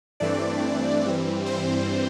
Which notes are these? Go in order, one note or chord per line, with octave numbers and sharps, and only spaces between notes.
G2 E3 A3 C4 D4 D5
G2 E3 G3 C4
C4 C5